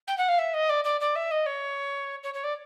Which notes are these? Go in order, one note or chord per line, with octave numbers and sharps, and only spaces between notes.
G5
F#5
F5
E5
D#5
D5
D5
D5
E5
D#5
C#5
C#5
C#5
D5